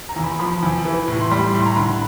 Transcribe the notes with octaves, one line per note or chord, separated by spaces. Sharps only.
A#5
E2
B5
F3 B5
E2
E3
A2
C6
G3 B5
A2 C6
A#5
D3 B5